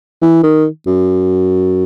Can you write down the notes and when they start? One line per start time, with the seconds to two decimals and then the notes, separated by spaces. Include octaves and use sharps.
0.22 E3
0.43 D#3
0.87 F#2